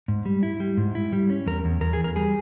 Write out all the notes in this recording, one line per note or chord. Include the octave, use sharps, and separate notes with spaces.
G#2
G3
E4
G3
G#2
E4
G3
C#4
E2 A#4
E2
E2 A#4
G#4
E2
A#4
G3 G#4